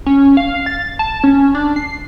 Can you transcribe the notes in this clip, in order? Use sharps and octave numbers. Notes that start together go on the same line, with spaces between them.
C#4
F5
A6
A5
C#4
D4
C7